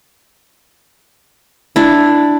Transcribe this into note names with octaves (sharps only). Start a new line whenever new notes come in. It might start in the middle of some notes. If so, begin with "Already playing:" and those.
D4 E4